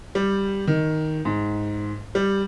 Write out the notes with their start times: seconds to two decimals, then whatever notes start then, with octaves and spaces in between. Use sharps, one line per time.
0.15 G3
0.67 D#3
1.25 G#2
2.15 G3